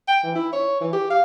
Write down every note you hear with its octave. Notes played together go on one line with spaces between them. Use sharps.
G5
E3
E4
C#5
E3
G4
F5